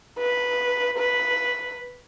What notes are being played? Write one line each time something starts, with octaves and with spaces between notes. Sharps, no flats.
B4
B4